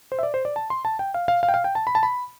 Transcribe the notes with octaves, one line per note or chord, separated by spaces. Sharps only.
C5
E5
D5
C5
D5
A5
C6
A5
G5
F5
F5
F5
G5
F5
G5
A5
B5
A5
B5